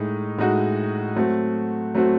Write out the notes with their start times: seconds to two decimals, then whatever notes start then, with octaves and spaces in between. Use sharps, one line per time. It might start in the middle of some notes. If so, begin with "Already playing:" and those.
Already playing: A2 G#3 D#4
0.38 A2 G#3 D#4 F#4
1.16 F#3 A3 C4 F#4
1.95 F#3 A3 C4 F#4